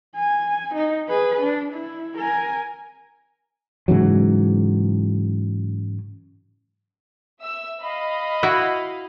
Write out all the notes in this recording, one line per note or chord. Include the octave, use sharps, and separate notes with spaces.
G#5
D#4
G#4 B4
D4
E4
A#4 G#5
G#2 C#3 E3 F#3
E5 E6
D#5 F5 B5
E4 F#4